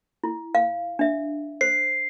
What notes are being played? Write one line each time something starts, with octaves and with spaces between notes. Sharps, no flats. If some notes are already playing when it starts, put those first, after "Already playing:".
E4
F5
D4 E5
C5 C7